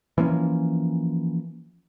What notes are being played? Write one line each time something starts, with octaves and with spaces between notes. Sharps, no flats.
E3 F3 A#3 C#4